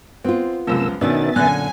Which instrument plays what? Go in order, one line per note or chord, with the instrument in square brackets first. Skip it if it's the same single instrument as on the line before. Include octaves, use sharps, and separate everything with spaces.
[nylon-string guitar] B3 F4 [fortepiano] C4
[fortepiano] C#2 F#2 F3 [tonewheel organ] C3 A#3 E6
[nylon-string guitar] B2 D#3 C#4 [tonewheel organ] B3 E5 A6 [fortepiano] D4
[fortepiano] F#2 F#6 [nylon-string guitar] A#2 D3 [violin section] G#5